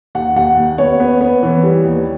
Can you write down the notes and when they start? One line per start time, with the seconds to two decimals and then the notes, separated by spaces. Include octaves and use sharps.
0.15 D#2 F#5
0.36 D#2 F#5
0.57 D#2
0.78 B3 C#5
1.00 B3
1.21 B3
1.43 E3
1.63 G3
1.85 D#2